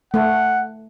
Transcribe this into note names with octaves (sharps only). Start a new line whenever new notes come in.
A3 F#5